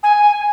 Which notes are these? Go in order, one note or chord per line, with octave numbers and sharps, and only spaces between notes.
G#5